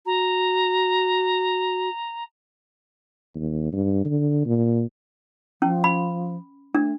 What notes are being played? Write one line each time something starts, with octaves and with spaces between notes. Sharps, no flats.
F#4 A#5
D#2
G2
D3
A#2
F3 C#4
B5
A3 D4